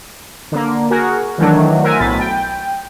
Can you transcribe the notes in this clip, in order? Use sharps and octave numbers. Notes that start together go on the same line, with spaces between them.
D3 A#3
F#4 G#4 A#4
D#3 E3 F#3 A3 D4
A#4 C5 E5 F#5 G#5
B1 A2 B5 A6
G5